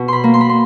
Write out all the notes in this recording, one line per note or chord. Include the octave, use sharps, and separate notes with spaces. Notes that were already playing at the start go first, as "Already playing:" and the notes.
Already playing: B2
B5 C6
A#3
C6
B5
C6